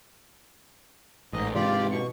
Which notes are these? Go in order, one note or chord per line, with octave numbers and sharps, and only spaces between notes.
A1 G#2 D#5
G#2 C3 E3 F4 G4 D5
B2 C#6